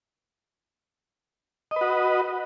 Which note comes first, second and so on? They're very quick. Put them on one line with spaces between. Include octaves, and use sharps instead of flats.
D#5 B4 F#4